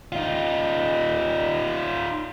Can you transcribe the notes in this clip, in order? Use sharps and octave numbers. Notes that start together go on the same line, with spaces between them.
D#4 F4